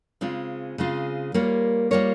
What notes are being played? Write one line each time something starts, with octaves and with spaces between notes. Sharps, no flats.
C#3 G#3 C4 F4
C#3 G#3 C4 F4
G3 A#3 F4 A#4 C#5
G3 A#3 F4 A#4 C#5